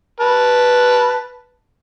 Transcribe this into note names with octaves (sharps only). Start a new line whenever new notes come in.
B4 A5